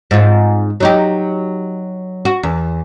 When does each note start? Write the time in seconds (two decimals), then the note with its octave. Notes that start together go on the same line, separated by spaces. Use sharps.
0.11 G#2 C4 F4
0.80 F#3 D#4 G4
2.25 F#4
2.43 E2